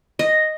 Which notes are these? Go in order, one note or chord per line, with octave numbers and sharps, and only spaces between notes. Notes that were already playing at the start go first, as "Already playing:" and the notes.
D#5